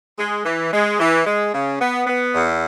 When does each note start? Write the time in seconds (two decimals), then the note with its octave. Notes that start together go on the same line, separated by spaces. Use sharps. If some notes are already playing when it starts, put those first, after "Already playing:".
0.18 G#3
0.45 E3
0.72 G#3
0.99 E3
1.26 G#3
1.53 C#3
1.80 B3
2.07 B3
2.34 E2